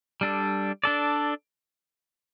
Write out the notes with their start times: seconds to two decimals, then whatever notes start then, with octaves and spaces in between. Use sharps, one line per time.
0.21 G3 D4 A4
0.84 D4 A4 D5